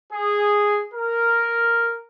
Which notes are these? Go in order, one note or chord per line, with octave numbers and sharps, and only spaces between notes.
G#4
A#4